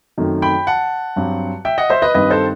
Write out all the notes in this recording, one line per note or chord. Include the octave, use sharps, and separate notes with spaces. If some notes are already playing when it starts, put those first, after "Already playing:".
F#2 D#3 A3 C4
G5 B5
F#5 A5
G2 F#3 C4
E5 G5
D#5 F#5
C5 E5
B4 D#5
G2 D#3 G3 C4 B4 D#5
A4 C5